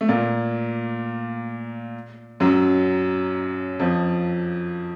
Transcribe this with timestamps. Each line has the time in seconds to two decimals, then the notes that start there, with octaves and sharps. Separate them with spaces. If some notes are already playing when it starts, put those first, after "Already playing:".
0.01 A3
0.08 A#2 A#3
2.40 F#2 F#3
3.79 F2 F3